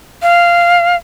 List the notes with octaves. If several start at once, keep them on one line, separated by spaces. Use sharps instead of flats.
F5